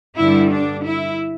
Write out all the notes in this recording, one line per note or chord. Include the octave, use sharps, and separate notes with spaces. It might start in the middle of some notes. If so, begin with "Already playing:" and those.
G2 D3 G3 E4
D4
E4